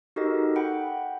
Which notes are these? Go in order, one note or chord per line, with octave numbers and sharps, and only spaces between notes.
D#4 F#4 G4 A4 A#4 D#5
F#5 G5 B5